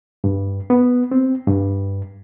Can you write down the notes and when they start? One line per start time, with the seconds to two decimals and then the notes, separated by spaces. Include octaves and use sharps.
0.24 G2
0.70 B3
1.12 C4
1.47 G2